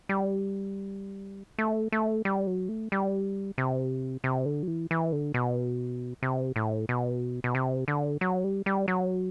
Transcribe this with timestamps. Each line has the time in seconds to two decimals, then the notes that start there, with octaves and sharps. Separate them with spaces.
0.09 G3
1.58 A3
1.92 A3
2.25 G3
2.47 F#3
2.69 A3
2.92 G3
3.58 C3
4.24 C3
4.46 D3
4.63 F#3
4.67 E3
4.91 E3
5.12 D3
5.34 B2
6.23 C3
6.56 A2
6.89 B2
7.44 B2
7.55 C3
7.88 D3
8.21 F#3
8.44 G3
8.66 G3
8.88 F#3